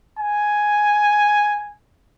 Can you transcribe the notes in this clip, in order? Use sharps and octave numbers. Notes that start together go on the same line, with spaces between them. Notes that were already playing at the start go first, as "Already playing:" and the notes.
G#5